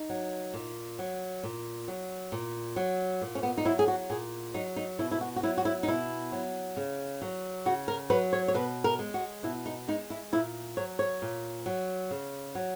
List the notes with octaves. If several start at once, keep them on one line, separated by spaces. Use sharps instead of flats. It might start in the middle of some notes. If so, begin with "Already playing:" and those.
Already playing: D#4
F#3
A#2
F#3
A#2
F#3
A#2
F#3
A#2
C#4
B3
D#4
F#3 E4
G#4
F#4
A#2 G#4
F#3 D#4
D#4
B2 E4
E4
F#4
F#4
F#3 E4
F#4
E4
D#4
B2 E4
F#3
C#3
F#3
C#3 F#4
A#4
F#3 B4
C#5
C#5
B2 B4
A#4
G#3
F#4
B2 E4
D#4
G#3 D#4
E4
A#2 E4
F#3 C#5
C#5
A#2
F#3
C#3
F#3